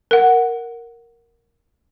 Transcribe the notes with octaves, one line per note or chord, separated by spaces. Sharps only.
A#4 F#5